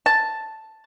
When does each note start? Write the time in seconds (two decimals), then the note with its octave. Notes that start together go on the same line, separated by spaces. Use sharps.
0.06 A5